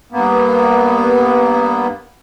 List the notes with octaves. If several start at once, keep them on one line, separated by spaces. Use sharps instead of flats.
G2 A#3 B3